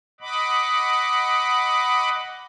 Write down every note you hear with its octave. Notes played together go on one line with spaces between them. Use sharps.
D#5 F#5 B5 D6